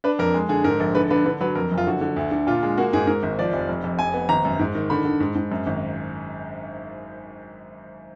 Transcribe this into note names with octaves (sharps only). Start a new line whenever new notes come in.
D4 B4
F2 A#4
G#3
D3 G#4
G#2 A#4
A#1
D3 B4
D3 B4
D3 B4
F#3 B4
F2 A#4
F#1
F4
D3 F#4
D3
D2
D3
A#2 F4
G#3
A#3 F#4
G#2 G#4
G#2 A#4
G#1
F3 D5
F1
F2
F2
F1 G#5
B3
G#1 A#5
F#2
G#2
D#3
D3 B5
D3
G#2
G#2
F#2
G#1